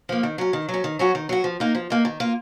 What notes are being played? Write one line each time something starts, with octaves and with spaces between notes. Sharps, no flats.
F3 A#3
D#3
F#3 C#4
D#3
F#3
C#4
D#3
F#3 C#4 F#4
D#3
F#3 C#4 F#4
F3
A#3 D#4
F3
A#3 D#4
D#3
A#3 F4